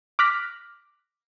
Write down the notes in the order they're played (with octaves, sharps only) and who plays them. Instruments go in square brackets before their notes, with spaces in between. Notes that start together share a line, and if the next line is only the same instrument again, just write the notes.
[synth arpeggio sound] D6 F6 F#6 A#6 B6